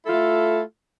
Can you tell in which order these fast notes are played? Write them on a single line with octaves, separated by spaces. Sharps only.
E4 A4 F4 A3